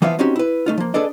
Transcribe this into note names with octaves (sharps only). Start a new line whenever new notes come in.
E3 F3 B3 F4 E5 F5
C4 C#4 D#4 F#4 G4
E4 B4
A3 D#4 F4
F3 A#3
D4 G#4 A4 B4 D5 D#5